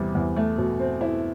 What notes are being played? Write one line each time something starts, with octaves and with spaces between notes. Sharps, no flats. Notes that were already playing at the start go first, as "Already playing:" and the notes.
Already playing: E2 C3 G3
E2
A3
B2
C4
E4